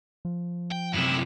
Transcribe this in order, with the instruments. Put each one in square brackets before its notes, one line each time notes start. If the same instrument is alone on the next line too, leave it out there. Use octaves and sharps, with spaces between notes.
[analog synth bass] F3
[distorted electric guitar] G5
[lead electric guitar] F#2 C3 [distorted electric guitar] E4